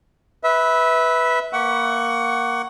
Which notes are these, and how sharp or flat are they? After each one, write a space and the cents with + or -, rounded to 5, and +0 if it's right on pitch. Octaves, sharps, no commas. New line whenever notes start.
B4 +0 E5 -20
A#3 +0 F#5 +20 C#6 +0